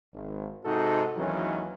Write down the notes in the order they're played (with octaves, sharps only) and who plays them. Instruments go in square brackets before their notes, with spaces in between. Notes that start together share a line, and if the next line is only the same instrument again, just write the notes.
[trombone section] G#1
G#2 C3 D#4 F#4 A4
G#1 D#2 D#3 E3 F#3 C#4